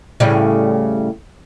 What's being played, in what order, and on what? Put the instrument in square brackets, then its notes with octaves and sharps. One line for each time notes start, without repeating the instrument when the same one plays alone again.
[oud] A2 C#3 G3